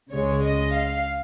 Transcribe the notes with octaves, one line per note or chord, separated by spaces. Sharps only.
C#2 C#3 G#3 C#5
D#5
F5